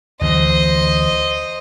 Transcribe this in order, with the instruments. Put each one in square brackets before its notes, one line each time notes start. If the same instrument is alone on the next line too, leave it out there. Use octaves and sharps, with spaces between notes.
[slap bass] D2 E3 F#3 [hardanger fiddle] C5 D#5